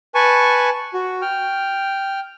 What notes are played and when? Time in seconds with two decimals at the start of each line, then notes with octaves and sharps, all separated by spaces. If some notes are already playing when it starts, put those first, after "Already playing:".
0.15 B4 G#5 A5 C#6
0.94 F#4
1.22 G5 F6